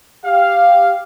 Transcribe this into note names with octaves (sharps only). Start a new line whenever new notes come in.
G4 F5